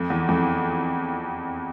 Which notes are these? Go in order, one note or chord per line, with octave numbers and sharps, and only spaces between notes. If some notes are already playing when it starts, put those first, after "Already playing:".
Already playing: F2
E2
F2